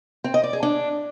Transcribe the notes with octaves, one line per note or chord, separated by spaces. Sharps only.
C4
D#5
D5
G#4
D4